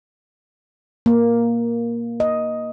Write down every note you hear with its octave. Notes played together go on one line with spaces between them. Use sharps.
A#3
D#5